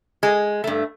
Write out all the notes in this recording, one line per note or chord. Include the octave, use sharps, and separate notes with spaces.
G#3
G2 A3